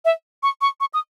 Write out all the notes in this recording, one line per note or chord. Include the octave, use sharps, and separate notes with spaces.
E5
C#6
C#6
C#6
D#6